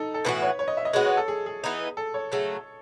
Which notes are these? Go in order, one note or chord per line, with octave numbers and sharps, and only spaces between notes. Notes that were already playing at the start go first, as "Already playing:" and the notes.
Already playing: D#4 A4
A4
A2 E3 B3 F#4 B4
C#5
C#5
D#5
E5
D#5
G#3 B3 F#4 C#5
C#5
A4
G#4
G#4
E3 B3 D#4
A4
C#5
C#3 F#3 A3